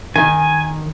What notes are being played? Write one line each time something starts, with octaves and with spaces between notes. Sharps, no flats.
D#3 G#5